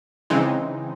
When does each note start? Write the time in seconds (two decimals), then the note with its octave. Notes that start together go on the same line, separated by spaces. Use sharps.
0.30 C#3 E3 G#3 C4 D#4